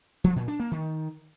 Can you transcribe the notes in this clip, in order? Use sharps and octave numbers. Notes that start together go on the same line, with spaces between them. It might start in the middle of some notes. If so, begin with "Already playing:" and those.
F3
A#2
D4
A#3
D#3